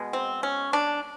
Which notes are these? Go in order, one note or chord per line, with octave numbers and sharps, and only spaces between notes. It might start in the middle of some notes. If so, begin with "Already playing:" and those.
Already playing: B2 G#3 B3
C4
C#4
D4